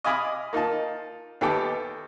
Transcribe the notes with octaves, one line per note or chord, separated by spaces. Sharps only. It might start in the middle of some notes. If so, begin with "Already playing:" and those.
D#5 F5 G#5 B5 D6 D#6
A#3 D#4 F4 A5
D#2 B3 G4 A4 D6